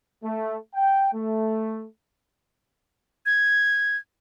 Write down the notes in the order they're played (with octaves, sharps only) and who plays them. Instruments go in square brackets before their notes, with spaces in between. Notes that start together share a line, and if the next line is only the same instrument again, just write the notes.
[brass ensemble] A3
G5
A3
[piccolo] G#6